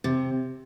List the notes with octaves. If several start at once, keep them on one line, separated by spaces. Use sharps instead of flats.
C3